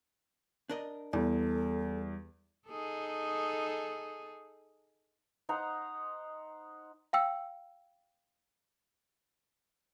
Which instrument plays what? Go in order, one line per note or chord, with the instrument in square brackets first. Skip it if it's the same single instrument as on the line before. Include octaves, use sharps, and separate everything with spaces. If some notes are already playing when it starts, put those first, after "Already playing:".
[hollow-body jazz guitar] D4 A#4 D#5
[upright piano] E2 [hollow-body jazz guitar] G3 [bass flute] A4
[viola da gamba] D#4 G#4 A4
[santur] D#4 C5 F#5 A#5
[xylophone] F5 G5 E6